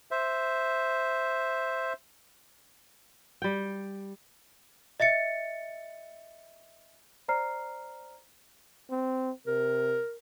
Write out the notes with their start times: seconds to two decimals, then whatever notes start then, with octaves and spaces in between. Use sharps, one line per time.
0.11 C5 E5
3.42 G3 G5
5.00 D#5 E5 A6 C#7
7.28 C5 D5 A#5 F6 C7
8.90 C4
9.47 C3 A#4